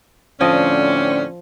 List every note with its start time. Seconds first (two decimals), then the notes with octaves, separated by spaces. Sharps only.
0.41 A2 D3 F3 C4 C#4 D5 D#5 G5